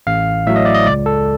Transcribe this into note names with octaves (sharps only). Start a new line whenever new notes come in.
A1 F5
A2 F#3 E5
D#5
D5
D#5
C#2 D5
A4